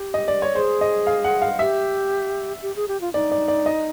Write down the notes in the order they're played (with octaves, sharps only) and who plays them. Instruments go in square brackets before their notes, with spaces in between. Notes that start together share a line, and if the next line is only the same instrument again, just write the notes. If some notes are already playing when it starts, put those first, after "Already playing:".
Already playing: [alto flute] G4
[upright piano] D#5
D5
C#5
[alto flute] G#4 [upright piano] C5
[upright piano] D#5
F5
F#5
F5
[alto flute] G4 [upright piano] E5
[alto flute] G4
G#4
G4
F4
[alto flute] D#4 [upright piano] D5
[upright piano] D5
D5
D#5